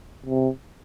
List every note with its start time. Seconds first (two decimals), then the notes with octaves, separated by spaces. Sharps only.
0.26 C3